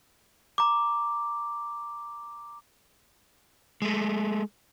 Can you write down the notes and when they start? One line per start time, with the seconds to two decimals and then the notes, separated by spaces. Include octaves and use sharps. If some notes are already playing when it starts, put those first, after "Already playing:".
0.58 A#5 D6
3.82 G#3 A3